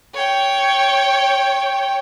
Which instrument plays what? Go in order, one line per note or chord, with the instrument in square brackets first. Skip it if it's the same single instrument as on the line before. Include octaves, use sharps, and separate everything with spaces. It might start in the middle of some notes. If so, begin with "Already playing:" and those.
[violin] C#5 G5